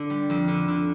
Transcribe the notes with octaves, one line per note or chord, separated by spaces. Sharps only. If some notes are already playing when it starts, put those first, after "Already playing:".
Already playing: D3 D4
G3
F2
D3
D3